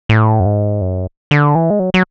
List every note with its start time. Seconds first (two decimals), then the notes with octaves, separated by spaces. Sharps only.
0.09 A2
0.40 F#2
0.46 G#2
0.81 F#2
1.31 D3
1.55 E3
1.70 G#3
1.79 F#3
1.94 F#3